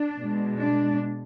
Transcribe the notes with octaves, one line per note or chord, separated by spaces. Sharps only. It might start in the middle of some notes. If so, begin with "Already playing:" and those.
Already playing: D4
B2 G#3
D4